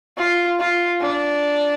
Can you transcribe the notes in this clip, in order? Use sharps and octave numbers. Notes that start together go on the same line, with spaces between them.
F4
F4
D4